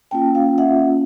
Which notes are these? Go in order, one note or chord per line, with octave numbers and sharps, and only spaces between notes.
A#3 C#4 F4 G5 A5
F5 G5
E5 F#5